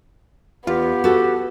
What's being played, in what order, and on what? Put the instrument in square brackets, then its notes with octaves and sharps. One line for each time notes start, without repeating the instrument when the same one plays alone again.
[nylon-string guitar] E2 F5 [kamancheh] B3 [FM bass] F4 [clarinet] G4
[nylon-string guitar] F#4 A4